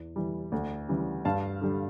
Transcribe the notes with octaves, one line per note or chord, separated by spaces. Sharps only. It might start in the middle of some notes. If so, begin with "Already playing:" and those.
Already playing: E2
E3 G3
D2
C#3 E3 G3
G2 F5 A5
D3 G3